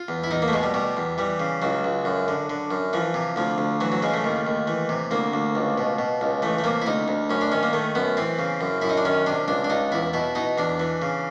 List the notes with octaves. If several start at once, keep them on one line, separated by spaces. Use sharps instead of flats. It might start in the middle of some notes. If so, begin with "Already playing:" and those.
Already playing: F4
E2
E4
E2 D#4
A#3
A3
B2 G#3
G3
B2 G3
E2
E3 G3
C#3
C#2 F#3
C#2
F#2
D3
D3
F#2
E3 F3
C3
D2 F3
D2
E3 F#3
F#3
C#3 G#3
A3
D#2
D#2
E3
C3
D2 A#3
D2
C#2
B2
B2
C#2
E3 A3
A3
C3 A#3
E4
D2 D#4
D2
F#2 C#4
D4
D#3 C#4
A#3
D#3 A3
F#2 B3
E3 C4
C#3
F#2
F#2 E4
D#4
D4
D#3 C#4
C3 D4
C#2 D4
D4
C#2 D#4
E2 E4
B2 E4
B2 D#4
E2 D4
E3
C#3